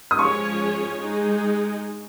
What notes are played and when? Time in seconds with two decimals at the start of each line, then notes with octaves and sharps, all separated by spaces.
0.11 D#6
0.19 F3 G#3 C#4 G#4 C#5 C#6
0.98 G#3 D#4 G#4